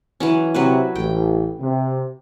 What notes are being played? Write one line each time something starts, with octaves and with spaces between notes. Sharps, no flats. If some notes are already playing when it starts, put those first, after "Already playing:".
E3 F#3 C#4
C3 F#3 F#4 B4
A1 G5
C3